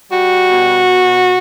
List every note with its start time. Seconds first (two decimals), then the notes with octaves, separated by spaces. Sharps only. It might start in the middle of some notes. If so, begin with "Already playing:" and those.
0.10 G3 F#4
0.48 B2